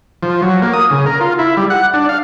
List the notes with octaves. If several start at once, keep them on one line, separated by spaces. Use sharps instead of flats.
F3
F#3
A#3
D#6
C#3
A#4
F4
E4
G3
F#5
D4
F5